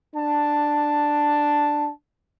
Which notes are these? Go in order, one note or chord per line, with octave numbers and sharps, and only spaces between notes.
D4 A5